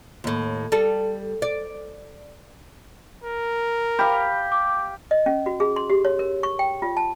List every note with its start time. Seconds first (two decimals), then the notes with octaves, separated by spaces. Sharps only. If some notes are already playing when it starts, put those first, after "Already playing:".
0.24 D#2 A2
0.72 G3 A4
1.42 D5
3.24 A#4
3.99 G4 F5 B5
4.52 D6
5.11 D#5
5.26 C#4
5.46 F#4
5.60 G#4
5.76 C6
5.90 G4
6.05 C#5
6.19 A#4
6.43 C#6
6.59 G5
6.82 F4
6.97 A5